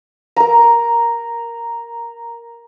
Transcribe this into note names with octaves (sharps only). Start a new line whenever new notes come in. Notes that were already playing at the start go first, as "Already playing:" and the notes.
A#4 A#5